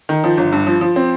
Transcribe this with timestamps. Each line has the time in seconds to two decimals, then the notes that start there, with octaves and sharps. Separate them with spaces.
0.09 D#3
0.24 F3
0.37 G1
0.52 G2
0.67 F3
0.81 F3
0.96 C4